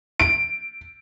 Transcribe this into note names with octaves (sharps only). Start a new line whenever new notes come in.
D7